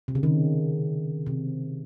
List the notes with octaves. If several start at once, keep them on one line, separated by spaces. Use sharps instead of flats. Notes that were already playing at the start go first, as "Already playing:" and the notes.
C3
C#3
D#3
C3